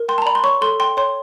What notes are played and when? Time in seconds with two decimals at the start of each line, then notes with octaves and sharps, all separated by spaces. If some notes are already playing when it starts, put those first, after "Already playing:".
Already playing: A#4
0.09 G5 C6
0.18 A5
0.22 A#5
0.26 D5 B5
0.35 C6
0.43 C#5 C#6
0.61 A4 C6
0.80 G5 C6
0.97 C#5 C6